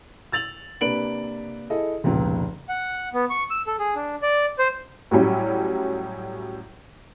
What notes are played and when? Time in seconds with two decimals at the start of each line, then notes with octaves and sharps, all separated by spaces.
0.32 E6 A6 F7 F#7
0.81 C3 A#3 D4 B4 D7 F#7
1.70 E4 G#4 A4 D#5
2.04 F1 C#2 A#2
2.69 F#5
3.14 B3
3.30 C#6
3.50 E6
3.67 A4
3.79 G#4
3.95 D4
4.22 D5
4.59 C5
5.11 A2 F#3 G3 C#4 E4